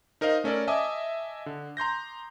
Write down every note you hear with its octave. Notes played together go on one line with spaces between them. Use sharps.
D#4 A#4 C5 D#5 F5
A3 C#4 A4 A#4 D5
D#5 E5 G#5 A5 D6 D#6
D3
A#5 C6 G6 A#6